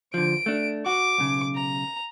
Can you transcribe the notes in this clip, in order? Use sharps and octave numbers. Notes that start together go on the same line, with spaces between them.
D3 F3 D7
A3 D4
F#4 D6
B1 C#3
A#5